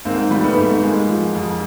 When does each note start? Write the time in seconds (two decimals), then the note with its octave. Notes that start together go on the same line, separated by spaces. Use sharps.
0.05 G#2 A#3 C4
0.31 G3
0.44 A3 B3
0.57 G#2
0.83 G#3 A#3
1.09 F3
1.35 F2